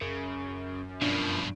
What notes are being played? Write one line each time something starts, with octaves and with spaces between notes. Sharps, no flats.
F#2 C#3
G2 B2 F3 D4